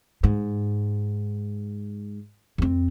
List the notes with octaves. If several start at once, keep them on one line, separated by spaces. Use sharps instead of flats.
G#2
F2 C4